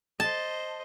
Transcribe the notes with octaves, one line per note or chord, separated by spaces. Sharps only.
C5 D#5 A5